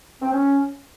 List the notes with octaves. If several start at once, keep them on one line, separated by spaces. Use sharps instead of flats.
C4
C#4